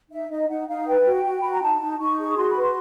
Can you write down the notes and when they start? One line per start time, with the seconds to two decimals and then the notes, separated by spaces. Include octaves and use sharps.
0.12 D#4 E5
0.30 D#4 D#5
0.49 D#4 F#5
0.68 D#4 F5
0.87 B4 G5
1.06 F#4
1.25 F#4
1.40 F#4 B5
1.51 A#5
1.62 D#4 A5
1.81 D#4
1.99 D#4 C#6
2.19 G#4
2.37 F#4 C6
2.50 B5
2.55 B4
2.62 C6